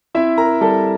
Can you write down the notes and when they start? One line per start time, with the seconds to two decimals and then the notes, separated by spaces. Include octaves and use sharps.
0.15 C4 E4 E5
0.37 A#4 A#5
0.61 G3 A4 A5